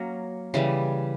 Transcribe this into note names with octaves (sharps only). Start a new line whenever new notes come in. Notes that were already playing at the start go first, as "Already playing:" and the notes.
Already playing: F#3 A#3 C#4
C#3 E3 G3